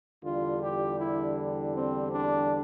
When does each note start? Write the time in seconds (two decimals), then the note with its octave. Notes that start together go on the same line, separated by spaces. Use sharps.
0.23 E2 D3 G3 F4
0.61 G4
0.99 E4
1.74 C4
2.12 D4